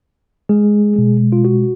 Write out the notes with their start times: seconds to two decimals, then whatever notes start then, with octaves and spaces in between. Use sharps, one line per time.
0.49 G#3 G#4
0.96 B2 G#3
1.32 F4
1.45 F#4